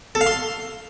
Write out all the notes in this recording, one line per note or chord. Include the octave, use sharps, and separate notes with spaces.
A4
F5
C6